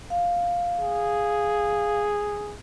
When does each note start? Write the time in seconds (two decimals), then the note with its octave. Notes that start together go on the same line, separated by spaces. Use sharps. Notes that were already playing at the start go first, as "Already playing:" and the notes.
0.10 F5
0.79 G#4